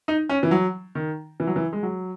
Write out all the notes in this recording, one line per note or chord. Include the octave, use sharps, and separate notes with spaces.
D#4
C#4
E3
F#3
D#3
E3
F#3
E3
G#3
F#3